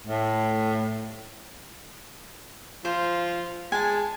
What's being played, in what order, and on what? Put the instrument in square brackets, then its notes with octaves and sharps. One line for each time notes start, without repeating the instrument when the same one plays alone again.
[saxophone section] A2
[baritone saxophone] F3 [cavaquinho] C5
[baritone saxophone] G#3 [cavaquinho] G#5 A5